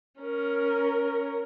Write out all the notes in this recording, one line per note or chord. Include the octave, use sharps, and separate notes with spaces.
C#4 A#4